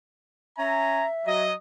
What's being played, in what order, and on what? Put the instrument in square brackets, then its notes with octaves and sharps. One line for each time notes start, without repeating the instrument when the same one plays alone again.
[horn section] C#4 G#5 A#5 [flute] E5
[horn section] F#3 D#5